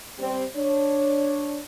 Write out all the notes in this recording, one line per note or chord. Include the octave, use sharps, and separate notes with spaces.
G3 C4
D4 C#5